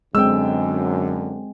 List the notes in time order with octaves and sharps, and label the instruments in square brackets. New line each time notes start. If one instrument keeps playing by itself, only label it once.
[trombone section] F#2 D3 [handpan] G#3 C4 [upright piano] G5 E6